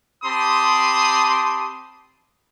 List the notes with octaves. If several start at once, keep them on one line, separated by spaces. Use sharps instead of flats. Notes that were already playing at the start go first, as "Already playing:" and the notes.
C4 G4 A5 B5 C6 D#6